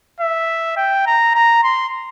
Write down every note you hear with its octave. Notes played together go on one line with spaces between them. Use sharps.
E5
G5
A#5
A#5
C6